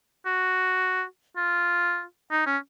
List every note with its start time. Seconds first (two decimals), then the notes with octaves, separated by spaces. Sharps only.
0.26 F#4
1.37 F4
2.32 D#4
2.46 C#4